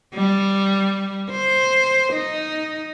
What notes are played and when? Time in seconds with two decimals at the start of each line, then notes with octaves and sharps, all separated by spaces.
0.15 G3
1.31 C5
2.13 D#4